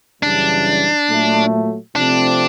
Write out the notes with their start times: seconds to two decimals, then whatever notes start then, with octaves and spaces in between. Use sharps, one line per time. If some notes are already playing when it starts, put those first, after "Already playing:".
0.22 F#2 C#3 E3 G3 D4
1.08 A#2 F#3 A3
1.96 C3 F3 A3 C4 D4